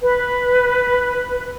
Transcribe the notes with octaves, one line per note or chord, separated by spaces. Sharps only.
B4